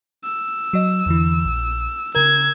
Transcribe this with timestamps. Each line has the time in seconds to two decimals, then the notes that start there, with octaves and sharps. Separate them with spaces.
0.24 E6
0.73 F#3 D#5
1.06 E2 D3 E3
1.45 A#1
2.15 C#3 A#4 E6 G#6